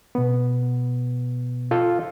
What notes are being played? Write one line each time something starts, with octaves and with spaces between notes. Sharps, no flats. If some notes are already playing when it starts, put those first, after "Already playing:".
B2 B3
F4 A4